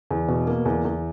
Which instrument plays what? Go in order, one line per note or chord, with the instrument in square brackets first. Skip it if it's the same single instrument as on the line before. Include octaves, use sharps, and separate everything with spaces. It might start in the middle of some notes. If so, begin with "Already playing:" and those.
[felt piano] E2
B2
A#3
E2
E2